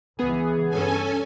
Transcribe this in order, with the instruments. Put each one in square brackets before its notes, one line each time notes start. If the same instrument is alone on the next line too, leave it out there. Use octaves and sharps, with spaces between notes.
[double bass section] C#2 E3 [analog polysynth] B3 G#4
[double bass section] G2 [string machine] C#4 A4 G#5